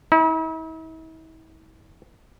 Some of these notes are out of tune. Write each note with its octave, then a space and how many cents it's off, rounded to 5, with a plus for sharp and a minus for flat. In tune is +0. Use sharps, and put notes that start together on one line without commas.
E4 -45